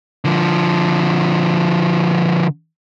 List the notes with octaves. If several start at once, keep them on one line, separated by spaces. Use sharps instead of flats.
D3 F3